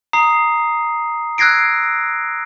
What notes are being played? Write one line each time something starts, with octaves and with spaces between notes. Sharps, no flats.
A#5 D#6 C7
E6 F#6 G#6 A#6 C7 D7